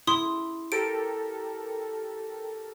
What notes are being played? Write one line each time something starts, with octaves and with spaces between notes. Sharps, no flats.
E4 C6 D#6
G4 A4 A#4 D7